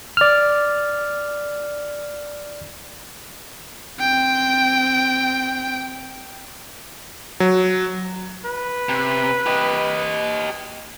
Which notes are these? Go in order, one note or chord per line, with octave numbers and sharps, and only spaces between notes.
D5 F6
C4 G5
F#3
B4
C3
G4 D#5